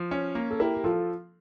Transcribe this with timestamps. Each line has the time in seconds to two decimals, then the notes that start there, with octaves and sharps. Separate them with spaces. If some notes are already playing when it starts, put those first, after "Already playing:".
Already playing: F3
0.11 C#4
0.35 A#3
0.51 A4
0.60 E4 G4 A#4
0.75 G4
0.84 F3 F4 A4